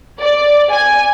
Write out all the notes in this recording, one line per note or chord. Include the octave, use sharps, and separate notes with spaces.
D5
G#5